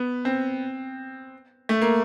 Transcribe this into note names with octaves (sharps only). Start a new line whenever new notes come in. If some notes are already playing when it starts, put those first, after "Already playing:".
Already playing: B3
C4
A3
A#3